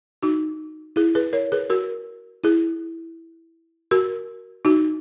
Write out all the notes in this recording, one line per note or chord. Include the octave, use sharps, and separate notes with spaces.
D#4 F#4
E4 G#4
G#4 B4
A#4 C#5
G#4 B4
F#4 A#4
E4 G#4
F#4 A#4
D#4 F#4